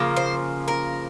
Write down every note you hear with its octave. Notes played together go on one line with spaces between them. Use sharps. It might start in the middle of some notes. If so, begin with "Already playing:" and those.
Already playing: C#3 F3 A#3
C5
A#4